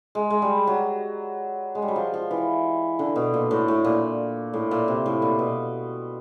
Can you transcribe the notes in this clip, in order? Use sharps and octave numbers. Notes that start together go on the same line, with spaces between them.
G#3
G#3
G3
F#3
G#3
G3
F#3
F3
F3
E3
D3
B2
A#2
A2
A2
A#2
A2
A#2
C3
A2
A#2
B2